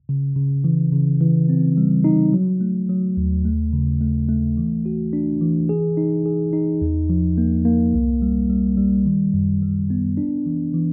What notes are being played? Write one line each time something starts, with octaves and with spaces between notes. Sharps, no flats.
C#3
C#3
E3
C#3
E3
C4
G3
D#4
F#3
A3
F#3
D#2
A3
C#3
A3
A3
E3
F#4
D4
E3
G#4
D#4
G#4
D#4
E2
F3
A#3
A#3
C2
G3
G3
G3
D#3
F#2
G3
B3
D4
E3
E3